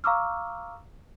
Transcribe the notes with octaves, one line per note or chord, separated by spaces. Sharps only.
F5 A#5 C#6 D6 E6 F6